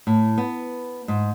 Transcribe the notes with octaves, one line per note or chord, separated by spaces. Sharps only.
A2
B3
G#2